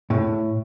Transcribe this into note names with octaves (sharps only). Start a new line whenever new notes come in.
A2